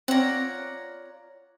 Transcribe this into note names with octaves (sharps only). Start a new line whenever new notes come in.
C4 F4 C#5 D5 F#5 A#5